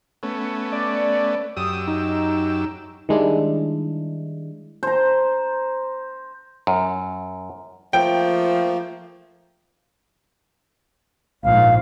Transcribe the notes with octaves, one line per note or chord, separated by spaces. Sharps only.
A3 B3 C#4
D5
F#2 G4 D#6 E6
D#4
D#3 G3 G#3 D4 E4
C5 A#5
F#2
F3 A3 A#3 G5
A#1 G#2 F5